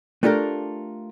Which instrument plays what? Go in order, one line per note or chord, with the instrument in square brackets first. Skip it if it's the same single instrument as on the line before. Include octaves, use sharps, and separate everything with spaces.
[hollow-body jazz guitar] A3 D4 F4 G4 A4 A#4